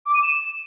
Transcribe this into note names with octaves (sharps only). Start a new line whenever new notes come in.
D6
D#7
E7